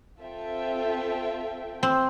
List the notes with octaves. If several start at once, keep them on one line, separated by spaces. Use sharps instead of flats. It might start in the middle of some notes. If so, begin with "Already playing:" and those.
C4 F4 A4 E5 G5
C4